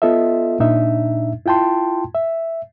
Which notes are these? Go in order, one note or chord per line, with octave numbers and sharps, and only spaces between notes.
B3 F4 A4 D#5 E5
A#2 D4 D#4 E5
E4 F4 G5 A5 C6
E5